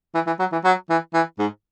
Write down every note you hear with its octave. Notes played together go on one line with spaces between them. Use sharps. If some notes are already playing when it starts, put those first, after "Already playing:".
E3
E3
F#3
E3
F#3
E3
E3
G#2